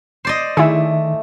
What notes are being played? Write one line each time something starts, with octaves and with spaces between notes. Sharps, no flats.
C5 D5 D#5
D#3 A3 E4 G#4